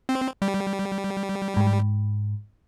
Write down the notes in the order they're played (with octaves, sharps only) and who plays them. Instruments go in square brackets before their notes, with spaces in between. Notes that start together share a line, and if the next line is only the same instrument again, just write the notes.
[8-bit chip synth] C4
G3
[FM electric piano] G#2